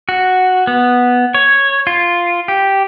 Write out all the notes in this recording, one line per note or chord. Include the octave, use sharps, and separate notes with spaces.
F#4
B3
C#5
F4
G4